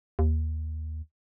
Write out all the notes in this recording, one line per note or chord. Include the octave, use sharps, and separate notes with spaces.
D#2